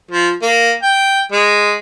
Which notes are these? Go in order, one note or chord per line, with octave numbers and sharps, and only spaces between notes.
F3
A#3
G5
G#3